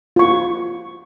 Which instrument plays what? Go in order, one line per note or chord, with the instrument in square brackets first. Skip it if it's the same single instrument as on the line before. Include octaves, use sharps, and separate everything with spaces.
[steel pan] F4 C#6